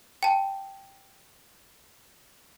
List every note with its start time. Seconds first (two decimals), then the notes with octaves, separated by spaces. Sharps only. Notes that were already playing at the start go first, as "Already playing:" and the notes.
0.23 G5 A5